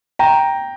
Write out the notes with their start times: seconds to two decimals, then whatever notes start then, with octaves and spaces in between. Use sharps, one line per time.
0.19 G5 A#5